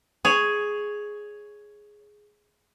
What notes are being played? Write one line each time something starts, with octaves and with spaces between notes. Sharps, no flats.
G#4 C#5